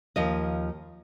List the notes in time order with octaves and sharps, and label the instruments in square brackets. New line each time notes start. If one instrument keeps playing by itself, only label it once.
[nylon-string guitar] D#2 F3 D#5